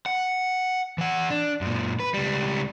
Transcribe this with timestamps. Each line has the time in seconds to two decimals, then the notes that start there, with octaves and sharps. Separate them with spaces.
0.06 F#5
0.98 E3 F#5
1.30 D4
1.61 F#2 A#2
2.00 B4
2.14 C#2 G3